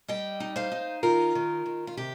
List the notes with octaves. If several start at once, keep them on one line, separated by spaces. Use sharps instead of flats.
G3 D#5 G5
D#4
C5 F5
D#4
D#3 F4 A#4
D#3
D#3
F4
C3 G4